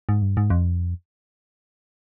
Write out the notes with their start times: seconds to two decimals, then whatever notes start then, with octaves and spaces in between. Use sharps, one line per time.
0.09 G#2
0.22 G2
0.37 G#2
0.50 F2